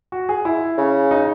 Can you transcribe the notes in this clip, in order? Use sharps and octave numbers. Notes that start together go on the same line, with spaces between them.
F#4
G#4
E4
C#3
D#4